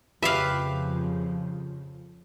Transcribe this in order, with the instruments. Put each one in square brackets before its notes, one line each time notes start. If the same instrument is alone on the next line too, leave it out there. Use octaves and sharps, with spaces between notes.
[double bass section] F2 C#3 F3 [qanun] G4 B4 [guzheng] E5 F5